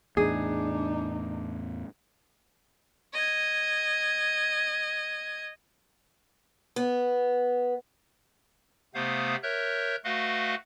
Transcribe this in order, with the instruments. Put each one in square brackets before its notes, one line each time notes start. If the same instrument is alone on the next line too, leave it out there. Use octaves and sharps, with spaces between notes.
[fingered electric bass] E2 A2 [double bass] D4 D#4 [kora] G#4
[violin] D#5 G#6
[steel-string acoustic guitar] B3
[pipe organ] C3 A3 B3 C5 F5 D#6
A#4 C#5 E5 F#6 G6
A3 F#4 B4 D#5 F5 F#5